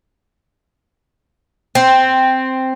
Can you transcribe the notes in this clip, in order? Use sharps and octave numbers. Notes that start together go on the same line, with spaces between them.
C4